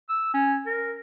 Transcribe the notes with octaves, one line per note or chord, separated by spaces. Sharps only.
E6
C#4
A#4